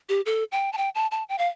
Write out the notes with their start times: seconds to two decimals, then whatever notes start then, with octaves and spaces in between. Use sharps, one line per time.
0.09 G4
0.26 A4
0.52 G5
0.73 A5
0.77 G5
0.95 A5
1.11 A5
1.29 G5
1.38 F5